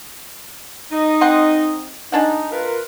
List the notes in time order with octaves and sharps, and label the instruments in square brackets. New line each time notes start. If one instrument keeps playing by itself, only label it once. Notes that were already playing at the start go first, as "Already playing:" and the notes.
[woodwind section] D#4 D#5
[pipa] C4 F#5 C6
[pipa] G#3 D4 F#5 [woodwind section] D#4
[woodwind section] F4 A#4 B4